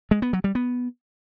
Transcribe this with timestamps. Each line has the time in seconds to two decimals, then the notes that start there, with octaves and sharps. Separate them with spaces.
0.11 G#3
0.22 B3
0.33 F#3
0.44 G3
0.55 B3